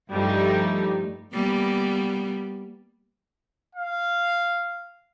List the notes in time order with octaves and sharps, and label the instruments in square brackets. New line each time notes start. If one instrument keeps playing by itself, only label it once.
[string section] G2 F3 G3 A3 D#4
[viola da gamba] G3 A#3 B3
[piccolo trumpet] F5